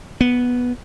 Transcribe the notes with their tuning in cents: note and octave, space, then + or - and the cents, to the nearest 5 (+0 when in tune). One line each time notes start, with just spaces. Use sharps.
B3 -5